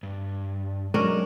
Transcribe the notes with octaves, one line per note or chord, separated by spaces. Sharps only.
G2
F#3 G#3 C#4 D4 A#4